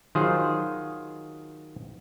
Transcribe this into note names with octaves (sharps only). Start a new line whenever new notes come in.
D#3 F#3 F4 G#4 C5